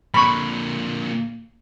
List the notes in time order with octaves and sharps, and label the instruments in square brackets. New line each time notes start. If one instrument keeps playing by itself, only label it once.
[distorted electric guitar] A#2 D3 [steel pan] B5 C#6